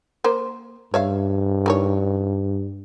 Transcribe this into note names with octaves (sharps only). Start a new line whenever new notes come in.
A#3 C5
G2 C#5 E5 F5
D#3 E3 C#5